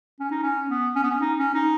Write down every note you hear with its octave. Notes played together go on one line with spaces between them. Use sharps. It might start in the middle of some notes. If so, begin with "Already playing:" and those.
C#4
D#4
C#4
B3
C#4
B3
C#4
D#4
C#4
D#4